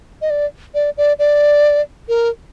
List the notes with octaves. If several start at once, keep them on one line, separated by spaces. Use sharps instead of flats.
D#5
D5
D5
D5
D5
A#4